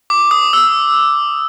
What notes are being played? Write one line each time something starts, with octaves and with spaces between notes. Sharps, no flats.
D6
D#6
E6